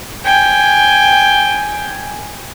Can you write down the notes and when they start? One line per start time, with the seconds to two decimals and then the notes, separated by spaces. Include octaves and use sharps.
0.25 G5 G#5